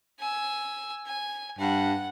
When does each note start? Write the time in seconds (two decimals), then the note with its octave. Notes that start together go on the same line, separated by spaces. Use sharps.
0.19 G#5 E6
1.06 G#5
1.59 G2 F#5